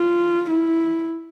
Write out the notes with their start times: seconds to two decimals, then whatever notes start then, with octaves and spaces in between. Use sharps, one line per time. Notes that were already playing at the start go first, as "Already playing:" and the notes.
Already playing: F4
0.51 E4